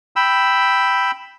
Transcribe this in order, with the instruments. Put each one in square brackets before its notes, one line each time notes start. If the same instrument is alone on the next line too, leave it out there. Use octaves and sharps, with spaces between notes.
[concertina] G5 B5 E6